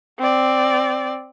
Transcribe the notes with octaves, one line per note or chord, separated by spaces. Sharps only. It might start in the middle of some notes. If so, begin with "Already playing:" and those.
C4 D5